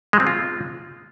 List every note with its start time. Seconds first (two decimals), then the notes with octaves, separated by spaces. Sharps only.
0.13 G#3
0.20 C4
0.27 F4